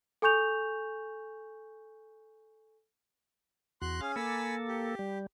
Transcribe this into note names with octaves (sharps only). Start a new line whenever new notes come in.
A4 G#5 C#6 G6 F7
E2 F#4 C6 F#6
C#4 G#4 F5
A#3 A4 G#5 B5 E6
G4
G3